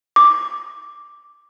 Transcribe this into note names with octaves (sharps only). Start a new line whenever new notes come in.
D6